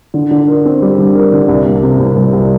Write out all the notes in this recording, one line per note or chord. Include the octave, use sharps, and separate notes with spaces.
D3
D3
A#4
C4
G3
D3
A#4
D3
C2
A#3
C3
C2
C2
C2